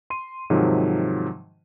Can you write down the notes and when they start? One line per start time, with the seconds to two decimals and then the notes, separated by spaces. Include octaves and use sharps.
0.10 C6 D#7
0.50 G#2 C3 D#3 F3 F#3